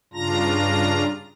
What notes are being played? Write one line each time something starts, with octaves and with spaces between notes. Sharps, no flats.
G2 C#3 D4 F4 A#5 A#6